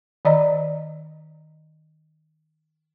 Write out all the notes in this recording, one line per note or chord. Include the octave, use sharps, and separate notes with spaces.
D#3 D5 D#5 A#5